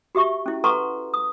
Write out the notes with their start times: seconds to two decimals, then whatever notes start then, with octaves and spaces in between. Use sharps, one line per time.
0.15 F#4 G4 E5 C#6
0.46 C#4 E4
0.64 A4 B4 F#5 A#5 C6 C#6
1.14 D#6